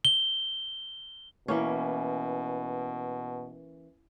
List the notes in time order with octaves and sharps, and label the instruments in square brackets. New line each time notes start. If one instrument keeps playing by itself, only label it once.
[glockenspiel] G7
[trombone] B2 [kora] E3 A#3 C#4